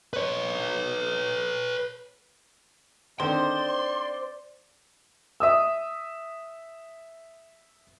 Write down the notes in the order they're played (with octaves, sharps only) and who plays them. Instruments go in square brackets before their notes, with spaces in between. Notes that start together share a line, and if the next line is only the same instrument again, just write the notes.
[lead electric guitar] B4 C#5
[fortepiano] D3 D#3 C4 [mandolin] C5 [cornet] D5 [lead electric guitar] C6
[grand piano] E5 D#6 E6